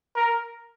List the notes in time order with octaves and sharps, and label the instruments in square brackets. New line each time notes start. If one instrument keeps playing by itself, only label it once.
[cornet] A#4